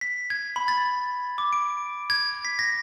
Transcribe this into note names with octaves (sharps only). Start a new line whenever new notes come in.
B6
G#6
B5
A6
D6
D7
G#6
B6
A#6